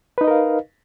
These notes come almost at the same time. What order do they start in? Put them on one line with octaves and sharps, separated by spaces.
B4 D#4 D#5 A#4 F5